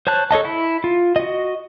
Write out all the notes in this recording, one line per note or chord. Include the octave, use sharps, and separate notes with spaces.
C5 C#5 A5 F#6
A4 C#5 D#5 A5
E4
F4
F#4 D#5